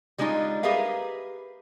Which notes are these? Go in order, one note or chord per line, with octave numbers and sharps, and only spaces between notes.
G3 G#3 D4 D#4 F4
G4 G#4 A#4 B4 E5 F5